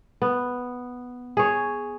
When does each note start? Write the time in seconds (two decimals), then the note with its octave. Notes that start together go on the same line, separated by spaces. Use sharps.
0.22 B3
1.37 G#4 C#5